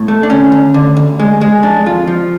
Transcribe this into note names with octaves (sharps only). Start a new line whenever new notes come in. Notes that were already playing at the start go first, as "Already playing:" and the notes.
Already playing: A2
A3
D4
D2 C#4
D2
D3
D2
G#3
G#3
F2 D4
F2 F4
F3